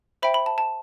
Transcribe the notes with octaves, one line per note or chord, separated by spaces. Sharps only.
C5 E5 G5 B5
B5
A5
A5